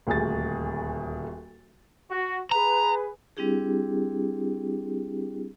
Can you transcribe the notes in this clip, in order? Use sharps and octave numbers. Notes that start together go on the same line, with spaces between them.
D#1 D2 G#4 A6
F#4
G#4 B4 A#5
G3 C4 D4 E4 G4 G#4